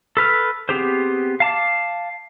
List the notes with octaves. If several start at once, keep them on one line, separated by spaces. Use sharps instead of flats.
A4 B4 F6
B3 C4 G4 G#4 C5
F5 A5 D6